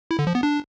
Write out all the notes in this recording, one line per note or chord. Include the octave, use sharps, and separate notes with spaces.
E4
D3
F3
B3
D4